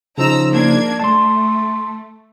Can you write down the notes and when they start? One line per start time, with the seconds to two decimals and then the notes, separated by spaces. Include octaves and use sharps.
0.18 C#3 F3 D#4 A#5 E6
0.51 A#3 D4 G#6
1.00 A3 A5 C6